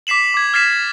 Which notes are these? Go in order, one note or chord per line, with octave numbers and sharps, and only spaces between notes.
D6 B6 C7 E7 F#7
D6 G#6
F6 G#6 A6 B6 C7 E7